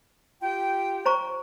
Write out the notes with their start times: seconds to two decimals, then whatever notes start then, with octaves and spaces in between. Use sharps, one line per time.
0.42 F4 G4 G5
1.06 C5 A#5 C#6